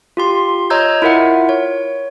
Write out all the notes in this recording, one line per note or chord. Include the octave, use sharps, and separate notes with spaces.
F4 G4 C6
C#5 D#5 A#5 E6 G6 G#6
E4 F4 A#4 E5 F#5
C#5